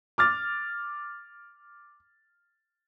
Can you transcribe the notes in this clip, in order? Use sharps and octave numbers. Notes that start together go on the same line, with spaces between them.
D6 F6 A6